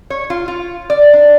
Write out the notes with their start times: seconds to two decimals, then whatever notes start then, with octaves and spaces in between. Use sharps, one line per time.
0.10 C#5
0.30 F4
0.48 F4
0.90 D5
1.13 D4